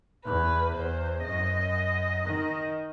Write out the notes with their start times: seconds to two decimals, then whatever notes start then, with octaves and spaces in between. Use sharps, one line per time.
0.25 E2 B4
0.75 E2 C5
1.24 F#2 D#5
2.24 D#3